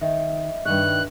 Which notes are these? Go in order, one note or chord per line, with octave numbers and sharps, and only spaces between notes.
D#3 D#5 E5
G2 D#3 C#5 F#6